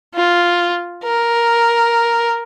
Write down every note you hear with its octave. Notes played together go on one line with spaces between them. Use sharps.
F4
A#4